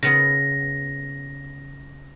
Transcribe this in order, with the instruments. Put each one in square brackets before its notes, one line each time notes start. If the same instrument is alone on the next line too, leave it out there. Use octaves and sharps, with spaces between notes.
[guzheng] C#3 B3 [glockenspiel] A#6